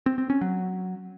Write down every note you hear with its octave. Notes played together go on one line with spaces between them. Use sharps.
C4
C4
C#4
F#3